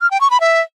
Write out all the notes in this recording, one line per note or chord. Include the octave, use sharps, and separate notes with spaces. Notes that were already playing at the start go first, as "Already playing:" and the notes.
F6
G5
C#6
B5
E5